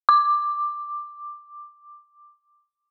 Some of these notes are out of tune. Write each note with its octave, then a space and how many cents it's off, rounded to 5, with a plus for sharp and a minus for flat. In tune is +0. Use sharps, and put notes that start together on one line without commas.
D6 +10